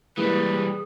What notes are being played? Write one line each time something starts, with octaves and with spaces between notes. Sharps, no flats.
E3 G3 G#3 A#3 E4 G#4 B4